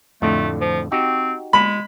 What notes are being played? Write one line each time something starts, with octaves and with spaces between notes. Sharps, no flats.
F2 A2 D3 A3
F3
C4 D#4 F#4 G4
G#3 B5